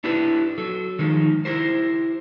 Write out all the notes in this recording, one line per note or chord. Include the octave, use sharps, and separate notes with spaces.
D4 E4 G4 B4
F#3 A4
D#3 F3 G#3 D#4
E4 G4 A#4 C5